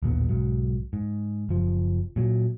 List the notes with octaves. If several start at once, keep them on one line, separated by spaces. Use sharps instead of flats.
D#1 A1 D#2 B3
B1 G#2 F#3
G#2
F#1 F3
A#2 F#3